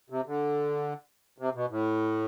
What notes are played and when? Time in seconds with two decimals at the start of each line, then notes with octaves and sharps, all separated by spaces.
0.10 C3
0.26 D3
1.38 C3
1.55 B2
1.70 A2